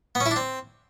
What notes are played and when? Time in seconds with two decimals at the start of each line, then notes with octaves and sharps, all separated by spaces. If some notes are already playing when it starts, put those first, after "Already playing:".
0.15 B3
0.21 C#4
0.26 E4
0.31 D4
0.36 C4